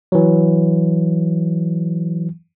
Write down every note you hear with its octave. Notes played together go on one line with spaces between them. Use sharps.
E3 F#3